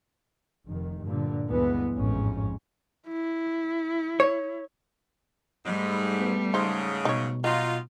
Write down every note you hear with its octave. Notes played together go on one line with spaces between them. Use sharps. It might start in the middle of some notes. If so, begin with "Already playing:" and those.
F1 D#3
G2 A#2 D3 F3
D2 G2 E3 G#3 B3
A1 F2 G#2 C#4
E4
C#5
G#2 G3 A3 B5
B3
G#2 C#3 D#4 C5 A5
B2 D#4 C#5
D#3 F#3 D#4 F4